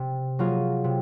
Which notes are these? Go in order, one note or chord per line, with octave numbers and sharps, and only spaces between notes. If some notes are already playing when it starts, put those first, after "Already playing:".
Already playing: C3
F#3 A#3 F4 G#4
C3